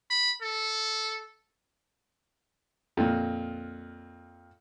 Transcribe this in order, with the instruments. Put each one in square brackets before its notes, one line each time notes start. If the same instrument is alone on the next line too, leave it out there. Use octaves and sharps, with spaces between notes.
[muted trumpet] B5
A4
[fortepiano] F2 A#2